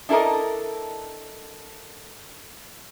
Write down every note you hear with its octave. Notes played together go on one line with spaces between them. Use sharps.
D4 E4 A4 A#4 D#5